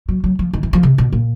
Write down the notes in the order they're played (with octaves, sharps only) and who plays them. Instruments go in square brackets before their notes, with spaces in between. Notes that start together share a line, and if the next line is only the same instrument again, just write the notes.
[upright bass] F#3
F#3
F3
D#3
E3
F3
C3
B2
A#2